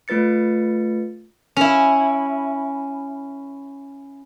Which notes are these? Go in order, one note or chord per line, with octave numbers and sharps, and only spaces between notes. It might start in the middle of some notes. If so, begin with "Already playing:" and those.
A3 F4 B4 A6 C#7
C#4 E4